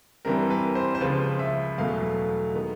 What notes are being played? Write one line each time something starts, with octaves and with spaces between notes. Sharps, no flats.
G2 E3 G3 C4 A#4
B4
C5
C5
C#2 C#3 F3 B4
E5
E2 B2 F#3 A3 F5
D#3 G#3 B3